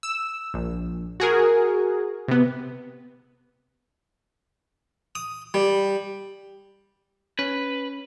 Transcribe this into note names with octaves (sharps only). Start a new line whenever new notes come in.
E6
A#1
F#4 G#4 A#4
C3 B3
D#6
G3
C#4 B4